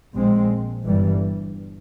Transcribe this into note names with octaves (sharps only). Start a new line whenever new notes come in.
A#1 A#2 G#3 C4
G1 G2 E3 G3